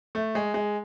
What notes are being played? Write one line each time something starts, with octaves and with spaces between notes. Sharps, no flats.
A3
G#3
G#3